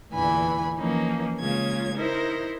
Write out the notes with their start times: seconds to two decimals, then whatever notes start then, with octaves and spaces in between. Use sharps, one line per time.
0.12 E2 A#2 D3 E3 G#5 B5
0.77 E3 F3 A#3 C#4 D#4
1.39 C#3 G#3 A#3 F4 C#5 G#6
1.94 D#4 E4 A#4 C5